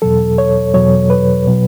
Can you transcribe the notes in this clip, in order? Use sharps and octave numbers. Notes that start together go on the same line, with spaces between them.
E2 B2 F#3 A4
C#5
E2 B2 F#3 C#5
B4
B2 F#3